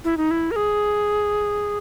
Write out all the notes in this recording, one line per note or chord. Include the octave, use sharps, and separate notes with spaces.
E4
D#4
E4
A#4
G#4